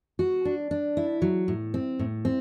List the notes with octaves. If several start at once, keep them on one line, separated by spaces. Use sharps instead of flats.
F#4
D4
D4
E4
F#3
A2
C4
A2
C4